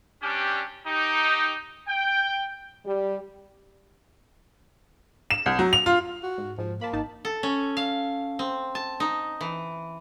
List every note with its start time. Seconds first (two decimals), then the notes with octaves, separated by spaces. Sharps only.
0.23 G3 C#4 D4 G4
0.87 D#4 G4
1.88 G5
2.85 G3
5.31 E7
5.46 C2
5.59 F#3
5.73 F7
5.86 F4
6.23 F#4
6.38 G#2
6.58 G#2 F3
6.81 A#3 A5 B5
6.93 G#1 D#4 A5
7.25 A4
7.43 C#4
7.77 F5
8.39 C4
8.75 A5
9.00 D#4
9.41 E3